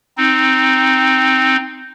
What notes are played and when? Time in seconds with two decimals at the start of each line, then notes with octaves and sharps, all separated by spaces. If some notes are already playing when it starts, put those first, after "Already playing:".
0.17 C4 D#4